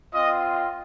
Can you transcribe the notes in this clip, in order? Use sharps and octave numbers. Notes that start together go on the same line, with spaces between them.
C4 F4 D#5